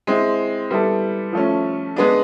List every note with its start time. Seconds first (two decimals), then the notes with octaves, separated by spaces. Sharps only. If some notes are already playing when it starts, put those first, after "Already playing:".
0.07 G#3 C4 E4
0.70 G3 B3 E4 A4
1.33 F3 A3 C#4
1.96 G#3 B3 D4